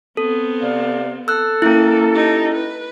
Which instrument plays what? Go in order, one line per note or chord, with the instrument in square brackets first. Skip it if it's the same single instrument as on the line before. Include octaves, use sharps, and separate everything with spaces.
[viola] B3 C4 [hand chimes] A4
[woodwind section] C3 D5 F5
[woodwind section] A4 [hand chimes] E6 F#6
[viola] A#3 [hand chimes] C#4 E4
[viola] D#4 G4
B4